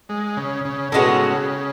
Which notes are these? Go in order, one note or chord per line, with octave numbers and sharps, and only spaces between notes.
G#3
C#3
C#3
A2 C#3 G#3 B3 F#4